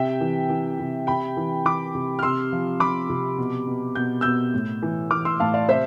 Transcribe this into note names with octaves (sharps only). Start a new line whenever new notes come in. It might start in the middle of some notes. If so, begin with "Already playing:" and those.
Already playing: C3 E5 G5
E3
E3
C3
C3 G5 B5
E3
E3 B5 D6
C3
F6
C3 C6 E6
F3
F3 B5 D6
C3
B2
B2
B2 G6
B2 E6 G6
A2
E3
E3 D6 F6
C6 E6
A2 F5 A5
D5 F5
C3 C5 E5